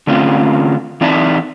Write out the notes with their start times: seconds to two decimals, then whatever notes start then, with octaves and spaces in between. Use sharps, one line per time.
0.07 D3 A3 C4 C#4 F4
1.01 E3 C4 D#4 D5 E5 A5